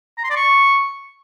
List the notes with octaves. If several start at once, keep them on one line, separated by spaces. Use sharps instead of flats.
A#5
C6
D5
C#6